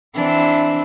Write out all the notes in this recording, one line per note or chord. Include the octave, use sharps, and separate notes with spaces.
E3 C4 D4